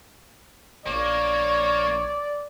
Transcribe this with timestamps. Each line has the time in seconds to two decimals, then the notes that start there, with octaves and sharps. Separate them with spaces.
0.87 A#1 A#3 C#5 D5